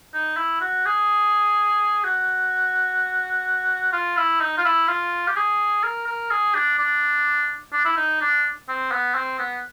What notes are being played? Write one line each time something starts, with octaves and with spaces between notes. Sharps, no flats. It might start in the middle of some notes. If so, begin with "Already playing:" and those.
D#4
E4
F#4
G#4
F#4
F4
E4
D#4
F4
E4
F4
G4
G#4
A#4
A#4
G#4
D4
D4
D4
E4
D#4
D4
C4
B3
C4
B3